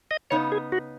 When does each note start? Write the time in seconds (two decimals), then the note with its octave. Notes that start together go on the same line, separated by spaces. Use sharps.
0.11 D#5
0.30 C#3 B3 D#4 C#5
0.52 G#4
0.72 F#4